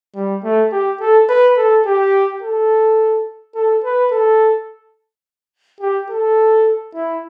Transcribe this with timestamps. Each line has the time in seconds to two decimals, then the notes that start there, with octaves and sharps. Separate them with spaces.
0.15 G3
0.44 A3
0.72 G4
1.00 A4
1.29 B4
1.57 A4
1.86 G4
2.42 A4
3.55 A4
3.84 B4
4.11 A4
5.81 G4
6.10 A4
6.95 E4